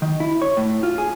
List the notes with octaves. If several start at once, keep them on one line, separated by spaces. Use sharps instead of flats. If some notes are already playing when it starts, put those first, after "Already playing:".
D#3
E4
C#5
A2
F4
G#4